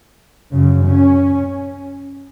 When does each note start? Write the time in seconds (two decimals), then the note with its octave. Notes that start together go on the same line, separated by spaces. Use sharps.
0.52 F#2 C#3
0.86 C#4